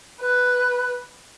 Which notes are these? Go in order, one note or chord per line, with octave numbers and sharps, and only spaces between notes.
B4